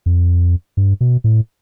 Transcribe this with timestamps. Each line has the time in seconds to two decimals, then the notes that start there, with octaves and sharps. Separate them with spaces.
0.06 F2
0.77 G2
1.01 B2
1.24 A2